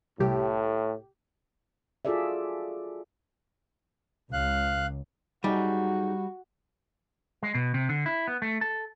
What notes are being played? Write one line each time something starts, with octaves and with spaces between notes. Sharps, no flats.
C2 A2 G4
F4 F#4 G#4 A4 D5 E5
C#2 F5 F#6
F#2 G3 D#4 F#4 G#4
G#3
B2
C3
D3
E4
B3
A3
A4